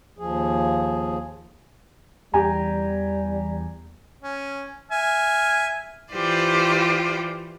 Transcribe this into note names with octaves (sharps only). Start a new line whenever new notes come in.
D#2 F3 G#4
E2 G3 G4 G#5 A#5
C#4
E5 G#5 F6
E3 F4 G4 C5 D5